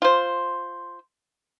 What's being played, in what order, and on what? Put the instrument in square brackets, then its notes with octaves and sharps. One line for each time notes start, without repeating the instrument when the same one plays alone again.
[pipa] F4 C5